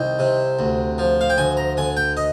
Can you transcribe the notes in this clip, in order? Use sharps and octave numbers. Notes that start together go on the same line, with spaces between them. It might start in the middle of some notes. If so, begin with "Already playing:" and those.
Already playing: C2 D#3 G5
C3
D2
F3
F5
G5
D2 G#5
A#5
D3 G#5
G5
D#5